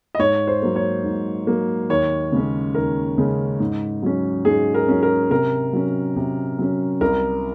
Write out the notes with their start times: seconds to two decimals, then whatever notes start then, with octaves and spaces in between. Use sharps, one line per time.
0.15 D#5
0.19 G#2 C#5
0.47 C5
0.62 F#3 A#3
0.76 C#5
1.04 G#2
1.47 F#3 A#3
1.90 D#2 C#5
2.32 C#3 G#3 C#4
2.74 D#2 A#4
3.18 C#3 G#3 C#4
3.60 G#2
4.03 F#3 C#4
4.45 G#2 G#4
4.74 A#4
4.88 F#3 C#4
5.03 A#4
5.30 C3 A#4
5.73 F#3 C#4
6.16 C3
6.59 F#3 C#4
7.01 C2 A#4